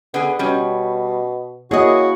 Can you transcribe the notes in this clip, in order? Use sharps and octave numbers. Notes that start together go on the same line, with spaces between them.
D3 B3 G#4
B2 G3 C#4
A#3 C#4 E4 F#4 G#4 D#5